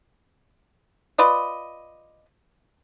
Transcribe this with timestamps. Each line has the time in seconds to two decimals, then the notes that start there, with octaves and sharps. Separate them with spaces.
1.18 F4 B4 D5 D#5